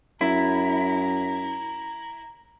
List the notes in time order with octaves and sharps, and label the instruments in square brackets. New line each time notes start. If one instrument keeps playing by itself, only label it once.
[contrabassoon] F#2 [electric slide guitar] E4 [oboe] A#5